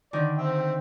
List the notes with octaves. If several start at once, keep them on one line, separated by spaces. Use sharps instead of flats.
D3 D#3 D5
C4 E5 G5